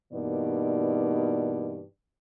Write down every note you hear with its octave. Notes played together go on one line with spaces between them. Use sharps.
G2 B2 E3 A#3 D#4 D5